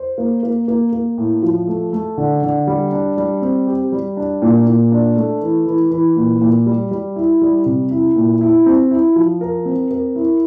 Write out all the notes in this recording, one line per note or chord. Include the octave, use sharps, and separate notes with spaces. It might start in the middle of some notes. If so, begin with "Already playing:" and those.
Already playing: C5
A#3
A#3
A#3
A#3
A2
F3
A3
A3
D3
D3
G3
D4
G3
C4
G4
G3
D4
A#2
A#2
D4
A3
E3
E3
E3
A#2
A#2
G3
G3
E4
G3
C3
E4
A#2
E4
C4
E4
F3
A#4
C4
A#4
E4